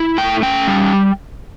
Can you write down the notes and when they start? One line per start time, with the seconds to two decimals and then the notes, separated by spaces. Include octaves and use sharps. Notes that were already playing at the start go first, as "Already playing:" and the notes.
Already playing: E4
0.18 A3 G5
0.43 C#4 G5
0.67 G3